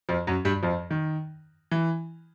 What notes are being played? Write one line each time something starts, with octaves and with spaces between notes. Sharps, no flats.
F2 F3
F#2 F#3
G2 G3
F2 F3
D#3
E3